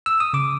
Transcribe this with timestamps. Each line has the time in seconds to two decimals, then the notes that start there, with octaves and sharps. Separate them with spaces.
0.06 E6
0.20 D#6
0.33 C#3 D6